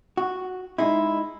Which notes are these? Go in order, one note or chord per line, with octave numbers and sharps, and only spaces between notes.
F#4
G#3 D#4 E4